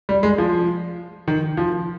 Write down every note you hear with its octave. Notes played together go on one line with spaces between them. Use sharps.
G3
G#3
F3
D#3
F3